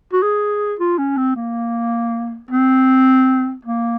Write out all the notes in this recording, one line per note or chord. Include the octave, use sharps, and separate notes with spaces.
F#4
G#4
F4
C#4
C4
A#3
C4
A#3